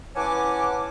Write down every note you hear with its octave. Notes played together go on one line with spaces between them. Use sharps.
E3 C#4 F#5 G#5 A5 D6